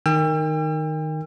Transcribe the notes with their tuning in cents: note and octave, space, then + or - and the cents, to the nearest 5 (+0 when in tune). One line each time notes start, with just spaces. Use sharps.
D#3 -10 G5 +35 E6 +40